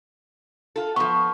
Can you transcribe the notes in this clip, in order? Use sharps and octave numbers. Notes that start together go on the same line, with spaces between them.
F4 A4
F3 B3 C#6